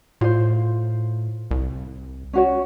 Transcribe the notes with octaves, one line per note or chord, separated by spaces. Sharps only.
A2 F4 C5
C2
C#4 F#4 C#5